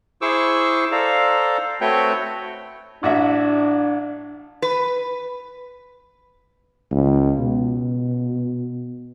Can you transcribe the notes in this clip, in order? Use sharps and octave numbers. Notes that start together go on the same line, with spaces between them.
E4 G#4 C5 C#6 D6 E6
A4 C5 D5 F5 A#5
A3 C4 F#4 B4 C#5 G5
A1 D4 F#4 E5
B4
C#2
B2